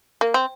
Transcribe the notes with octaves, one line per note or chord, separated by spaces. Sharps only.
A#3
C4